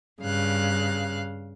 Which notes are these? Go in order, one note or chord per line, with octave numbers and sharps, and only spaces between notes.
G2 C#3 F5 F#6